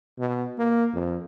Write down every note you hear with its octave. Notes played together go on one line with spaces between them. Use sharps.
B2
A#3
F2